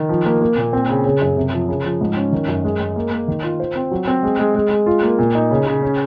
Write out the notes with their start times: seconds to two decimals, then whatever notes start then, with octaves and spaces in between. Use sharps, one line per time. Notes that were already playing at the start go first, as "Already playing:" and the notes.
Already playing: D#3
0.09 F3
0.26 A#3
0.42 A#3
0.57 A#2
0.73 C4
0.89 C#3
1.05 C#3
1.21 F#2
1.37 C3
1.53 F3
1.68 C#3
1.84 F3
2.01 G#2
2.16 C#4
2.32 D#3
2.48 F#2
2.64 G#3
2.80 G#3
2.96 A#3
3.11 A#3
3.28 D#3
3.43 F4
3.60 C5
3.75 C4
3.91 F#3
4.07 C4
4.23 G#3
4.39 G#3
4.55 G#3
4.71 G#3
4.86 F4
5.03 A#3
5.19 A#2
5.35 D#4
5.51 C#3
5.67 C#3
5.82 C#4